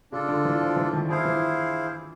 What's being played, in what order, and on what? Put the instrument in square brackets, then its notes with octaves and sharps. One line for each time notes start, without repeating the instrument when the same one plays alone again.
[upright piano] C#3 [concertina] D4 F4 A4
[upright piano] D3
E3
F3
E3
D#3
[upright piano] F3 [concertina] E4 G#4 C5 F5
[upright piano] E3